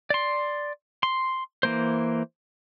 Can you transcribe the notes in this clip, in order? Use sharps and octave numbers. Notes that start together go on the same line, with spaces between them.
D5 C6
C6
E3 A#3 C5